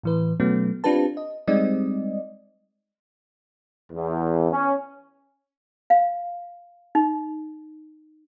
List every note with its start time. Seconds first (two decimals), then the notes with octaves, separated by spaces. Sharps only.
0.03 A2 E3 B4
0.40 B2 F#3 A3 B3 C#4
0.84 C4 D4 F4 G4 B4 A5
1.17 D#5
1.47 G3 G#3 C4 D#4 D5 D#5
3.93 E2
4.52 C#4
5.90 F5
6.95 D#4